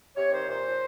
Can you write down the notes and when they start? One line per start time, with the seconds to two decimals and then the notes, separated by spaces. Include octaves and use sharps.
0.16 C3 C#5
0.32 D#3 C5
0.48 A#2 C5
0.65 F3